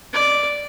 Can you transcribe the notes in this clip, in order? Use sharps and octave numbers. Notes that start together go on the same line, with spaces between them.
D5